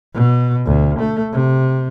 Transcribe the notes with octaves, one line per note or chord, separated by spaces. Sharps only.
B2
D2
A3
C3